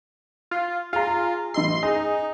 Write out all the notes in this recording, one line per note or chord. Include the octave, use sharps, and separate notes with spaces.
F4
F4 G#4 A#5
A1 D#5 C6 E6
D#4 G#4